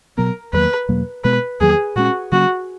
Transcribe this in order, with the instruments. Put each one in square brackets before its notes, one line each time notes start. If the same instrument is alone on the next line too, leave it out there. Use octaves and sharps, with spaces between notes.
[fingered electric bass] B2 F#3 B3 [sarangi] A#4
[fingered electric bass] E2 D#3 F#3 A#3 [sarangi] B4
[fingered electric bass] E2 B2 F#3 A#3
[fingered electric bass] B2 G#3 B3 [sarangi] B4
[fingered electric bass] E2 D#3 F#3 A#3 [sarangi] G#4
[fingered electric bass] A#2 G#3 C#4 [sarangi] F#4
[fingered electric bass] C#3 F#3 A#3 C#4 [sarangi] F#4